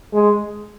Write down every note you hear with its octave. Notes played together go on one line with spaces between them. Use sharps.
G#3